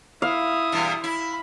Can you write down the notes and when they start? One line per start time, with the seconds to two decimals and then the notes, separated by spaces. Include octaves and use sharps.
0.22 E4 F5 D#6
0.72 E2 G2 B2
1.04 E4 B5